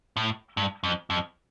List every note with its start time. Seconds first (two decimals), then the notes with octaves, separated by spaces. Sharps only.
0.17 A2
0.57 G2
0.84 F2
1.10 F2